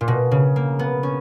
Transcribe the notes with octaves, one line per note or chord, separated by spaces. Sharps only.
A#2
B2
C#3
A#3
B3
C#4